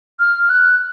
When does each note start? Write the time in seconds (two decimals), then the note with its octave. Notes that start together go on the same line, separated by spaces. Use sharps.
0.19 F6
0.50 F#6